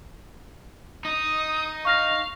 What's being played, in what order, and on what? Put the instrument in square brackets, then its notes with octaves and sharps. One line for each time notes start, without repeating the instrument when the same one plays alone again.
[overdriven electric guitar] D#4 [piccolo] D#6
[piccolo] F5 [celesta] C#6 F6 A#6